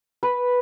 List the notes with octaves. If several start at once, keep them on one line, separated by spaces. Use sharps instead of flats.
B4